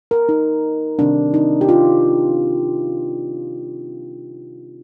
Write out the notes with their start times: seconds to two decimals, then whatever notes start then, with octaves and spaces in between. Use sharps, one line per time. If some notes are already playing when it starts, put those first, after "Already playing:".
0.11 A#4
0.29 D#4
0.99 C3 D#3 G3 C4 D4
1.34 D#4
1.61 G4
1.69 F4